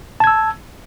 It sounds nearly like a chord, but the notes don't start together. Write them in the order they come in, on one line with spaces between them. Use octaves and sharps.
A5 G#6 E6